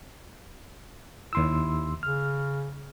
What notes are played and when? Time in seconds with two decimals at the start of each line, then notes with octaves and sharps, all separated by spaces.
1.33 D#2 E4 C6 E6
2.03 C#3 F6